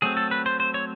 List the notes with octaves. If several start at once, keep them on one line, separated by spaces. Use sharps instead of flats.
F#3 A3 C4 G#4
A4
B4
C5
C5
C#5